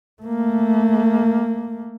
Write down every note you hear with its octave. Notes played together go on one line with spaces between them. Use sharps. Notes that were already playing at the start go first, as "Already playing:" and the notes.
A3 A#3